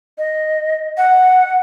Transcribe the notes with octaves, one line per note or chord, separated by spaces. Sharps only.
D#5
F#5